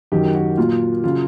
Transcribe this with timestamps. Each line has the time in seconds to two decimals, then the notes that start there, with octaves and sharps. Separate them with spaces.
0.12 F#2 D#3 F#3 G4
0.35 F#4
0.57 A#2 F#3 F4
1.04 C#3 F#3 F4